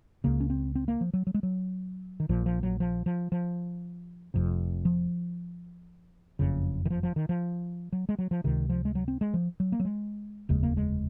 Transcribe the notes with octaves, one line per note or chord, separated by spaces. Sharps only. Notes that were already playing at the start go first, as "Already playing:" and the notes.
C#2 C#3 A#3
C#4
C4
C4
A#3
F3
F#3
F#3
G#3
F#3
D#3
A#1 A#2 F3
F3
F#3
F3
F3
F3
F1 F2 C3
F3
F#1 F2 C#3
D#3
F3
F3
D#3
F3
F#3
G#3
F#3
F3
C#2 C3 D#3
F3
G#3
F#3
C4
G#3
F3
F#3
A#3
F#3
G#3
F1 D#2 C#3 G#3
A#3
G#3